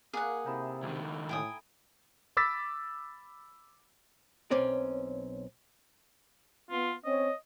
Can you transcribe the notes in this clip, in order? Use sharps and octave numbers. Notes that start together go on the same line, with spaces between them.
A#3 G#4 F#5
C3 D#4 E4 A4
C#2 D#3
A2 G5 G#5 D#6
B5 D6 E6 A6 B6
B1 C4 C#4 D5
B3 F4
C4 C#4 C#5 D#5